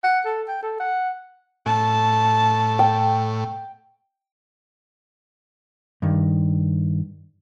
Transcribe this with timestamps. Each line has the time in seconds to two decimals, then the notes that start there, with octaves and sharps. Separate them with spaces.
0.03 F#5
0.25 A4
0.48 G5
0.62 A4
0.79 F#5
1.66 A2 A5
2.79 G5
6.02 G2 D#3